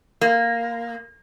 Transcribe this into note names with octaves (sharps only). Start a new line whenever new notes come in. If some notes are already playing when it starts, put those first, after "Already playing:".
A#3